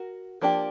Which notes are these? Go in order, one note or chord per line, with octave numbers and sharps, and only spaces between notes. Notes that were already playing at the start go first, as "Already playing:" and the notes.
Already playing: F#4 A#4
F3 A#3 D4 G4